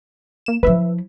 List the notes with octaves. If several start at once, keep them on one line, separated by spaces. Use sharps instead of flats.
A#3 E7
F3 E4 B4 E5